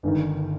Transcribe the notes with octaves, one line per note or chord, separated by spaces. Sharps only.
G1 G2 D#3